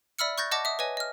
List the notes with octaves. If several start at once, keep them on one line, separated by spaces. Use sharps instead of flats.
D5 E5 B5 E6 F6 C#7
C#6 F#6 G6 A6 A#6
D#5 F#5 A5 D6 A#6
E5 D#6
B4 C#5 D#5 G#5
D#5 F6